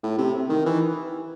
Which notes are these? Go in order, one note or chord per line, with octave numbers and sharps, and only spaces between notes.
A2
C3
D#3
E3